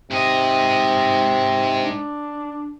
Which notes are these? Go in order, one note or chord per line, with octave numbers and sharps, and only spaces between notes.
G#2 C3 D#5
D4